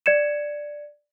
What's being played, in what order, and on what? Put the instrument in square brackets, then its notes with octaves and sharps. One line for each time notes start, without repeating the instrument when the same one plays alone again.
[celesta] D5 G#6 C#7 E7